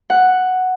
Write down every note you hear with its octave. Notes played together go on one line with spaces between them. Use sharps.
F#5